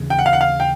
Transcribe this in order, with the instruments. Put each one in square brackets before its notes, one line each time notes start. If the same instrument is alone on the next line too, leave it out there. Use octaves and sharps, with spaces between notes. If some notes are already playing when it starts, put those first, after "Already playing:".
Already playing: [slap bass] D#2 C#3 E3
[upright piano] G5
F#5
F5
F#5
F5
G5